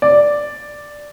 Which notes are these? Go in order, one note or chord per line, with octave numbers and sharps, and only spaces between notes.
D5